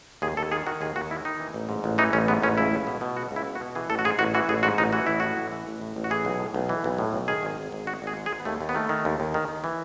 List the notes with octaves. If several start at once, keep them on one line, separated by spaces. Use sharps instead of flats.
D#2 G#4
D#2 A4
D#3 G#4
D#3 F#4
D#2 G#4
D#2 F#4
D#3 E4
D#3 D#4
E3
A1
G#2
A1
E3 D#4
A1 C#4
G#2 B3
A1 C#4
C#2 E4
C#2
B2
B2
C#2 F#4
C#2
E4
B2
F#4
B2
E3 G#4
A1 A4
F#4
G#2 G#4
A1 F#4
E3 F#4
A1 G#4
G#2 F#4
A1 D#4
E3 F#4
A1 E4
A2 F#4
A1
E3
A1
A2
A1
F#4
E3 G#4
B1
A2
B1
E3
B1
A2
B1
D#3 G#4
G#1
G#2
G#1
D#3 F#4
G#1
G#4
G#2
G#4
G#1
B3
D#2 A3
D#2
B3
D#3 A3
D#3
D#2
D#2
D#3
D#3
E3